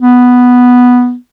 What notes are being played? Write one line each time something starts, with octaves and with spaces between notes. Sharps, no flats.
B3